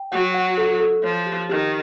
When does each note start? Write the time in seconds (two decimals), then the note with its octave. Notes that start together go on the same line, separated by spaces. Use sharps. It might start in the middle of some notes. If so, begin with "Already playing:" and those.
Already playing: G5
0.12 F#3 F#5
0.34 F#5
0.57 A4
0.80 A4
1.03 F3 C#5
1.26 G4
1.49 D#3 G4